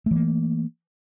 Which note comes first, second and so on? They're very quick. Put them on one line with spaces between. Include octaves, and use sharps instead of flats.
A3 E3 A#3